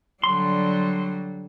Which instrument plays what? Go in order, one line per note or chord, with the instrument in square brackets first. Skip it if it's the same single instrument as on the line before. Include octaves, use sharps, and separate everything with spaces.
[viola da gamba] D3 F#3 G3 [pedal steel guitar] C6